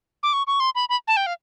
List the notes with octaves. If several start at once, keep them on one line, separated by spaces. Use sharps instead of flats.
D6
C#6
C#6
C6
B5
B5
A5
G5
F5